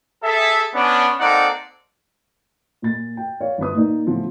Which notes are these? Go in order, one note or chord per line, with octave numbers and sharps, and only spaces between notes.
G#4 A4 E5
B3 C#4 D4
A#3 C4 D#4 A4 D5 F#5
A#2 A6
G5
C#5 D5 F5
G1 C4 B4 D#6
A#2 A#3 D#4 D5
A2 C#3 E3 F3 B3 C4